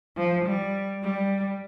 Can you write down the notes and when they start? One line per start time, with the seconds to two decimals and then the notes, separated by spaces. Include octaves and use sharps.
0.17 F3
0.46 G3
1.03 G3